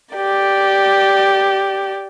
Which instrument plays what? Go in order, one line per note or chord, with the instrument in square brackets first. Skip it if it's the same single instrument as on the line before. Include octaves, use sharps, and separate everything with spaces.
[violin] G4 D5